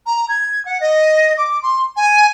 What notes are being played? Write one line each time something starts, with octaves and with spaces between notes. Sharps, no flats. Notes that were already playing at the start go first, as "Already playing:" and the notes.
A#5
G#6
F#5
D#5
D6
C6
G#5